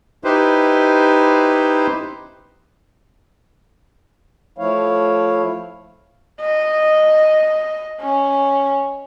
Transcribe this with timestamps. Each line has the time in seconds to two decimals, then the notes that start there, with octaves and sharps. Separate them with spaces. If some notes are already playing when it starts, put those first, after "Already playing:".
0.24 D#4 E4 G4 B4 C5
4.58 F3 A3 E4 C#5 F5
6.40 D#5
8.00 C#4